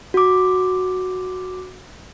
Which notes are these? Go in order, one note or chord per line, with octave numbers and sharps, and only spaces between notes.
F#4 D6